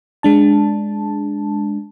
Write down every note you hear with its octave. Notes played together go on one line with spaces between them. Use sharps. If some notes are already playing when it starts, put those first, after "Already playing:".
G#3 D4 A5